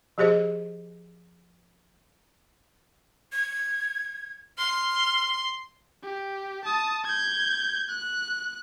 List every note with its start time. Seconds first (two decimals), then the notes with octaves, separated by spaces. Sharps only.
0.18 F3 G4 G#4 C5 D#5
3.32 G#6
4.58 C6 F6
6.03 G4
6.65 A5 D#6
7.05 G6 G#6
7.89 F#6